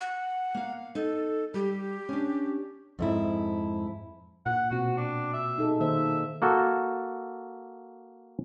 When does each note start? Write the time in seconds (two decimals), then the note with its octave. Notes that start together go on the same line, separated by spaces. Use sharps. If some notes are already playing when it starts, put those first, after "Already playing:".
0.01 F#5
0.55 A#3 F5
0.95 D#4 A4
1.54 G3 G4
2.09 C#4 D4
2.99 F2 G#2 E4
4.46 A#2 F#5
4.71 B2 C4 F#4
4.97 D4
5.34 E5
5.58 D#4 G#4 A4
5.80 D#3 A#3 C5 E5
6.42 A#3 F#4 A4